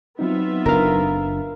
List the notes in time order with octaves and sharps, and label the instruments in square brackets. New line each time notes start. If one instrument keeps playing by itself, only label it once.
[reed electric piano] F#3 C4 D#4 [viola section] B3 F4 E5
[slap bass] F#1 D4 [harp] A#4 F5